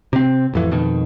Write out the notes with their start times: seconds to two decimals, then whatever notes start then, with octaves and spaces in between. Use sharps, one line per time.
0.13 C3 C4
0.54 A1 F2 E3
0.71 F2 B2 D#3